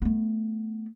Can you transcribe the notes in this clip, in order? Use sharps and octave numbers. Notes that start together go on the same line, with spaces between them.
A3 B3